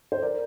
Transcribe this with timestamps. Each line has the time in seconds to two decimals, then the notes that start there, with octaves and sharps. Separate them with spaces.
0.12 C5
0.22 A#4 D5